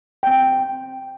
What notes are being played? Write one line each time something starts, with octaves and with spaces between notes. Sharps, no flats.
C4 G5